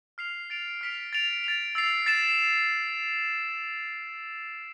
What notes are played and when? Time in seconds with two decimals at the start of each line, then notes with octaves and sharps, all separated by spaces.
0.18 F6 C7 F7
0.50 A6 D7 F7
0.81 F6 B6 D7 F7
1.13 A6 D7 F7
1.44 A6 D7 F7
1.75 E6 A6 C7 F7
2.06 A6 C7 E7